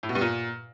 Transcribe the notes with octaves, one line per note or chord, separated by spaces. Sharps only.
A2
B2
G2
A#2